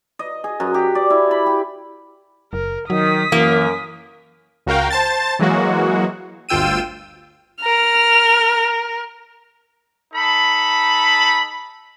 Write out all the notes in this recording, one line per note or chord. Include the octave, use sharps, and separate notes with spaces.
D#5
G#4
F#2
G4
D5
E4
B5
G4
F#1 A#4
D#3 F#3 D#6 B6
F#2 E3 A#3
C#2 F#4 A#4 F5 G5
C5 A5 A6
E3 F#3 G#3 A#3 F#4
G1 D2 F4 G5 E6 D#7
A#4 F6
D#4 A4 B5